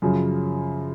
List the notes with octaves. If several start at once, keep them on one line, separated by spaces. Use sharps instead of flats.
F#2 C#3 F3